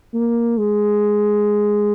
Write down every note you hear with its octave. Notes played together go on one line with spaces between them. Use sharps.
A#3
G#3